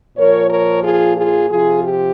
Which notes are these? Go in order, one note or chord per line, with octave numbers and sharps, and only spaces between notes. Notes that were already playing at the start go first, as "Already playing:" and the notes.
A#2 F3 A#4 C#5
A#4 C#5
F4 G#4
F4 G#4
C3 F3 F4 G#4
G4